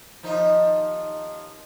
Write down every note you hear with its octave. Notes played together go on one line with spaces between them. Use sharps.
D#2 F3 D#4